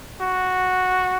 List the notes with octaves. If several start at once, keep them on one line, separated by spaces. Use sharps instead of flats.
F#4